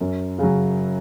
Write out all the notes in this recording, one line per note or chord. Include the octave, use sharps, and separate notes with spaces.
F#2
C#3 F#3